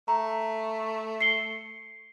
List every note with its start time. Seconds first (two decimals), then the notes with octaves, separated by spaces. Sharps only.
0.08 A3 A#5
1.21 C7 C#7 G7